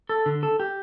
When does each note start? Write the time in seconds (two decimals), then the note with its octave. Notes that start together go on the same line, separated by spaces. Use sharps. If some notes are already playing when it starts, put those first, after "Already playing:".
0.09 A4
0.26 D3
0.43 A4
0.60 G4